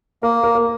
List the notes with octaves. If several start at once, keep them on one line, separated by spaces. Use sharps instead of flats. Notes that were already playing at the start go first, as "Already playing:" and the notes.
A#3 A#4
A#4
A#4